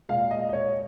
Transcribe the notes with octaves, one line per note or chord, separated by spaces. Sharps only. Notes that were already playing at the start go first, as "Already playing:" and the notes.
A#2 G#3 F5
D#5
D#5
C#5